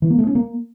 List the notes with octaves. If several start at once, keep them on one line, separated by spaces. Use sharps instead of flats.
E3
A#3
A3
C#4
A#3